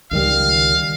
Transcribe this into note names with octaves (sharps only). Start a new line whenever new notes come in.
C#2 D#3 G3 F5